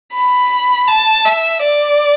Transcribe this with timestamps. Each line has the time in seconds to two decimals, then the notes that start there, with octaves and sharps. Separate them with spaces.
0.13 B5
0.88 A5
1.25 E5
1.63 D5